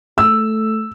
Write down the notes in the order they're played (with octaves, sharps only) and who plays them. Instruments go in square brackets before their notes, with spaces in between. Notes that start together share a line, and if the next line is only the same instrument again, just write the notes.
[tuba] A3 [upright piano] E6